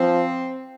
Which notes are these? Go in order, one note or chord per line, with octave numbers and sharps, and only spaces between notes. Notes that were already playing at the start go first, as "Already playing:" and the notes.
Already playing: F3 C4